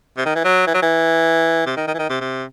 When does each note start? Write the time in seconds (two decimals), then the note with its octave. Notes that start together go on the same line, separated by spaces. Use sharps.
0.17 C3
0.26 D#3
0.36 E3
0.45 F#3
0.67 E3
0.74 F#3
0.82 E3
1.66 C3
1.76 D#3
1.88 D#3
1.95 E3
1.99 D#3
2.10 C3
2.21 C3